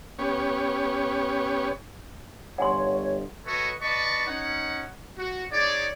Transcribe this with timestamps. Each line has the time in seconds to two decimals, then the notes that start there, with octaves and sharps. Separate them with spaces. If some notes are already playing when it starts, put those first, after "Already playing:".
0.19 B3 C#4 G4 C#5
2.58 G1 C#5 F#5 G#5 C6
3.46 F#4 A4 B4 C#5 D#5 C#6
3.82 B4 D5 D#5 A5 C#6
4.27 C#4 D#4 F#5
5.18 F#4
5.51 D#4 G#4 C#5 D5